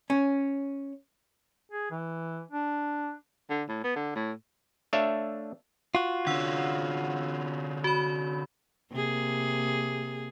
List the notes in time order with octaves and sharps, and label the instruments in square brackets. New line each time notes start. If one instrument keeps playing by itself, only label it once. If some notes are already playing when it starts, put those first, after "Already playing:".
[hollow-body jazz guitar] C#4
[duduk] G#4
E3
D4
[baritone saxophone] D3
A2
B3
D3
A2
[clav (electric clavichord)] A3 D4 C#5 E5 F5
[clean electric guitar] F4 F#4
[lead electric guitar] D3 C#4 [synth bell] F#5 E6
[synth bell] F#4 B5
[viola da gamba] C3 A#3 G#4